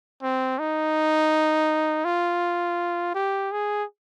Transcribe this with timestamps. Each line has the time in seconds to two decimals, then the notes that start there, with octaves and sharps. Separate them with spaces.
0.23 C4
0.59 D#4
2.05 F4
3.14 G4
3.52 G#4